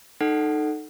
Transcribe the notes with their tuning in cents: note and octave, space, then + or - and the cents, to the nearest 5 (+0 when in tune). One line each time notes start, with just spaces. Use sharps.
D#4 -20 A4 +0 F#5 +15